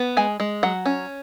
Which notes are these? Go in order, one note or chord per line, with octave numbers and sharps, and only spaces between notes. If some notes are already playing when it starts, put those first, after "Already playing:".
Already playing: B3
G#3 G#5
G#3
F#3 F#5
C#4